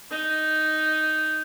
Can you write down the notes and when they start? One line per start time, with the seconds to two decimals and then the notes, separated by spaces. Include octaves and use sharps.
0.11 D#4